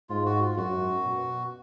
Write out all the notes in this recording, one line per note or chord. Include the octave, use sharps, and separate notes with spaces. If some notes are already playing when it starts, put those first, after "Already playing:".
G#2 F4
F#4
F4
F#2 F#4
B2